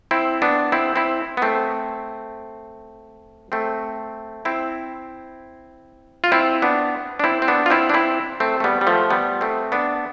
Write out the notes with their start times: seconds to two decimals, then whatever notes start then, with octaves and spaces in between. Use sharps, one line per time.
0.11 C4 E4
0.42 B3 D4
0.72 C4 E4
0.96 C4 E4
1.37 B3
1.42 A3 C4
3.52 A3 C4
4.45 C4 E4
6.24 F4
6.32 C4 E4
6.62 B3 D4
7.20 D4
7.24 C4 E4
7.42 C4
7.48 B3 D4
7.66 F4
7.70 C4 E4
7.89 D4
7.94 C4 E4
8.40 A3 C4
8.60 A3
8.64 G3 B3
8.81 G3
8.87 F3 A3
9.10 G3 B3
9.41 A3 C4
9.72 B3 D4